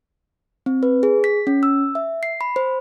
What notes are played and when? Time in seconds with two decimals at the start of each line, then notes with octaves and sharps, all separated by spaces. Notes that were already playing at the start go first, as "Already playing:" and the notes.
0.66 C4
0.83 B4
1.03 G#4
1.24 B6
1.47 C#4
1.63 E6
1.95 E5
2.23 C7
2.41 B5
2.56 C5